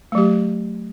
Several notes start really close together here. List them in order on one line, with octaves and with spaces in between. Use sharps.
A3 F#3 G4